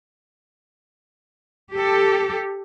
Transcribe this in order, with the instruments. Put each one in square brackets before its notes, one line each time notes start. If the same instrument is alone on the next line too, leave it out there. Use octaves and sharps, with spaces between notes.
[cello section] G4 A4